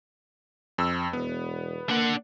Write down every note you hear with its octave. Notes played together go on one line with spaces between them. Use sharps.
F2 E6
E1 B3
A#3 D4 F#5